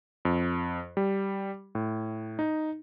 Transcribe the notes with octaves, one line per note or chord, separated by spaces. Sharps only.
F2
G3
A2
D#4